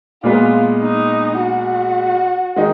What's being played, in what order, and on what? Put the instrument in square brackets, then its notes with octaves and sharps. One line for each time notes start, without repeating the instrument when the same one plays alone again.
[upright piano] A#2 G#3 B3 [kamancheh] F4
[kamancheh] D#4
F#4
[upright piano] D#3 G#3 D#4